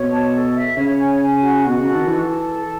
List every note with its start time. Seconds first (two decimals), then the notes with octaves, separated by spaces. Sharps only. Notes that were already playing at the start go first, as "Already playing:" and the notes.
Already playing: B2 C#5
0.10 A5
0.32 A4
0.54 E5
0.76 C#3 C#5
0.98 G#5
1.20 G#5
1.42 F#4
1.64 B2 F#4
1.80 C#3
1.86 A4
1.93 D#3
2.07 E3 A4
2.29 A5
2.51 A4